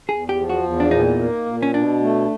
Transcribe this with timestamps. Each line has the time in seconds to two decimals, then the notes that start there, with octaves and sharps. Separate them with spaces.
0.08 E2 G#4
0.29 G4
0.37 F3
0.50 F#4
0.63 E2
0.80 D4
0.91 A#2 D#4
1.19 A#3
1.45 A#2
1.62 C#4
1.74 B2 D4
2.01 A3